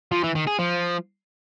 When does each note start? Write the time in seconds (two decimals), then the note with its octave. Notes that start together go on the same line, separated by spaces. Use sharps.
0.12 F3
0.24 E3
0.35 D#3
0.47 G#4
0.59 F3